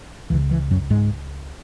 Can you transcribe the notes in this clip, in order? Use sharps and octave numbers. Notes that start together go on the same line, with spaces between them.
C#2 C#3 E3
E3
F#2 F#3
G#2 G#3